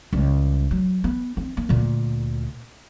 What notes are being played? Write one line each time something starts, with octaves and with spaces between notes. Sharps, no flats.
C#2 G3
F#3
B3
C4
A#3
D2 A#2